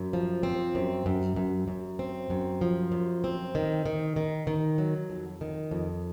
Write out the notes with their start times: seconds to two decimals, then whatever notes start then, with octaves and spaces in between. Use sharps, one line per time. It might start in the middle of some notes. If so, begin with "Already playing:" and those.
Already playing: F#2
0.13 F3
0.43 C4
0.75 F#2
1.06 F#2
1.36 F#2
1.68 F#2
1.99 C4
2.30 F#2
2.61 F3
2.92 F#2
3.24 C4
3.55 D#3
3.86 D#3
4.16 D#3
4.47 D#3
4.78 F#3
5.10 F2
5.41 D#3
5.71 F2